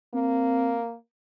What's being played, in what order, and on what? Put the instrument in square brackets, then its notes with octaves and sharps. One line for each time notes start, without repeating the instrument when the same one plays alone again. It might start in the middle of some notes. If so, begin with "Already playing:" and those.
[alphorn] A#3 [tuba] C4